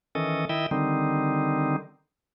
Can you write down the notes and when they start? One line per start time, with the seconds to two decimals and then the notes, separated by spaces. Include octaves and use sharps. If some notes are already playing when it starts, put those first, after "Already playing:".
0.15 D#3 E3 C#4 A4 D#5
0.49 D#3 E4 D#5 E5 G5
0.71 D3 D#3 G3 C4 D#4